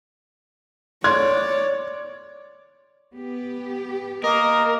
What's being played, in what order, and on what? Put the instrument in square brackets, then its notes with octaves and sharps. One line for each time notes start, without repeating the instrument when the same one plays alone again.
[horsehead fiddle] C#5 [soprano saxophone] D5 [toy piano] C6 [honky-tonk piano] G#6
[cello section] B3 G4
[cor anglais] A#3 [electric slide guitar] A#4 [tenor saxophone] D#5